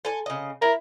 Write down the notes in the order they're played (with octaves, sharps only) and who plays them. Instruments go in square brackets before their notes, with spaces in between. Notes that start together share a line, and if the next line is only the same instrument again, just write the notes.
[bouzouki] A4 G#5
C#3 D#5
[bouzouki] E4 [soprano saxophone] A#4